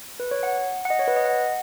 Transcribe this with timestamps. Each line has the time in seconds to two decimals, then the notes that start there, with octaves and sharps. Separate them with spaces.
0.20 B4
0.31 C#5
0.43 F#5
0.85 F#5
0.90 D#5
0.99 C#5
1.08 B4
1.17 D#5
1.25 F#5